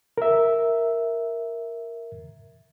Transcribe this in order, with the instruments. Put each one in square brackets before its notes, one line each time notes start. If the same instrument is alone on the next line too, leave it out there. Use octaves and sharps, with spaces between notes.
[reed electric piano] A#4 E5